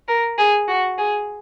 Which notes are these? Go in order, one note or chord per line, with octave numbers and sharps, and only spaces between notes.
A#4
G#4
F#4
G#4